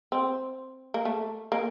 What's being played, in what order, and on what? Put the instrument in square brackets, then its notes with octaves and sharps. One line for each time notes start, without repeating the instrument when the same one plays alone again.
[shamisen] C4
A#3
A3
A#3